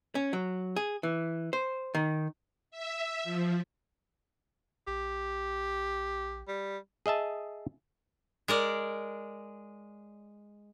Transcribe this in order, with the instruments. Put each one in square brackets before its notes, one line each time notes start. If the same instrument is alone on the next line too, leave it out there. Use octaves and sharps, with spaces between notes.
[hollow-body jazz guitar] C#4
F#3
G#4
E3
C5
D#3
[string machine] E5
F3
[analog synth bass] A#1 [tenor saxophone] G4
[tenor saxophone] G3
[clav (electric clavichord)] G#4 D#5 E5 A5
[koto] G#3 A#4 D5